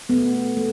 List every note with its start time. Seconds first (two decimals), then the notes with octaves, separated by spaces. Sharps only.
0.09 A3 B3
0.33 A3
0.57 A3